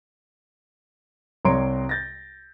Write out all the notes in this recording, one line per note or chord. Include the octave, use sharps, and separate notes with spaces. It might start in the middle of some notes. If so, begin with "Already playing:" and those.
C2 C3 C#5 A#5 C6 D7
G6 A6 A#6